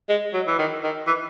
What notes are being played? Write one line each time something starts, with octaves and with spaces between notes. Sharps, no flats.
G#3
F#3
E3
D#3
D#3
E3